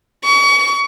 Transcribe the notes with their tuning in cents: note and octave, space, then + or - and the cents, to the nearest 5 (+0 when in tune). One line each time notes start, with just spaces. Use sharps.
C#6 +35